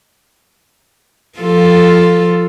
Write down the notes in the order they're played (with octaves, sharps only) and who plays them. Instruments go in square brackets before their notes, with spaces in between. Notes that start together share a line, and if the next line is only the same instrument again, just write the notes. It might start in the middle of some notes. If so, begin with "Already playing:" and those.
[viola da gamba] F3 F4 A4